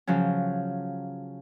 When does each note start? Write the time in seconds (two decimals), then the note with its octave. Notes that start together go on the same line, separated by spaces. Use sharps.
0.07 C#3 F3 F#3 C#4